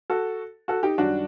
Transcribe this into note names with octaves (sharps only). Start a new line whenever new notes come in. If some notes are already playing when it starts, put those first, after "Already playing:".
F#4 A4
F#4 A4
D#4 G4
F#2 D#3 G3 D4 F#4